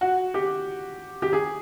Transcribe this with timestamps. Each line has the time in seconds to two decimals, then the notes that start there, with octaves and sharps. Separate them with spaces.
0.01 F#4
0.34 G4
1.22 G4
1.33 G#4